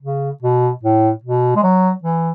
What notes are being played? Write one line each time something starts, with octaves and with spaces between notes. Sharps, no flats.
C#3
B2
A2
B2
G#3
F#3
E3